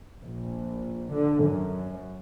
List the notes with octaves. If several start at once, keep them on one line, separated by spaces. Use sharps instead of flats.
A#1
D3
F#2